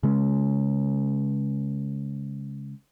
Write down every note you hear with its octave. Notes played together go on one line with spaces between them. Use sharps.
C#3 G#3 C#4